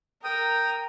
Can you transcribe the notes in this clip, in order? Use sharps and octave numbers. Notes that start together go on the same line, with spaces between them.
A#4 G5 D#6